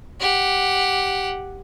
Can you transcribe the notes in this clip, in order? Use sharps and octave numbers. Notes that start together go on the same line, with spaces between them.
G4 F#5